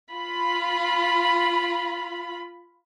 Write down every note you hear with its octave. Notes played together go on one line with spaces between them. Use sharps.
F4 B5